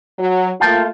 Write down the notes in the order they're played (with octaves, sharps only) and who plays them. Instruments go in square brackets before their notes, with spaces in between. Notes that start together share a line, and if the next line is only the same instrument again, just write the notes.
[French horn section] F#3
[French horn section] A3 A#3 F4 [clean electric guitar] F5 G5 A5